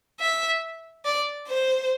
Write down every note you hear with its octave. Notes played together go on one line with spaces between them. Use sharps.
E5
D5
C5